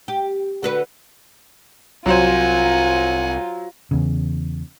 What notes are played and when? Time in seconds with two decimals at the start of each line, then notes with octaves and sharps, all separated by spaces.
0.08 G4
0.63 D3 F#4 B4
2.06 C2 F#3 F4 C5 F#5 G#5
3.91 E2 C#3